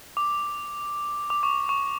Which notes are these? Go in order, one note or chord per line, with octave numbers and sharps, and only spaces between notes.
D6
D6
C#6
C#6